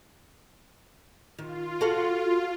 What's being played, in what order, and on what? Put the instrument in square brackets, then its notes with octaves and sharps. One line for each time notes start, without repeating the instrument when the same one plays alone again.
[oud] D#3 [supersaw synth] F4
[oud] F#4 A4 F5